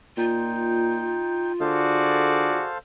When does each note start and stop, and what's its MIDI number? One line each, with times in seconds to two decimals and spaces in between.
0.17 1.17 46
0.17 1.52 63
0.17 2.57 65
0.17 1.52 79
1.60 2.61 50
1.60 2.69 66
1.60 2.69 68
1.60 2.78 69
1.60 2.78 72
1.60 2.69 74
1.60 2.78 77